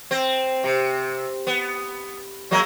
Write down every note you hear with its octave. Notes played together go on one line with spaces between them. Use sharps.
C4
C3
B3
F#3 G#3 A#3